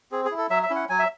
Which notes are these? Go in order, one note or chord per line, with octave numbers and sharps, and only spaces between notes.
C4 G#4
G#4
E4
A4
F#3 E5
E5
C#4 E4
F#5
F#3 G#5
E5